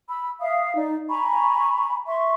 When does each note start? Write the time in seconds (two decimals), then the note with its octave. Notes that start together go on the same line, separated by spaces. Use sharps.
0.08 B5 E6
0.41 E5 F5 D#6
0.75 D#4 D5
1.08 G#5 A#5 B5 C#6
2.06 E5 C6 C#6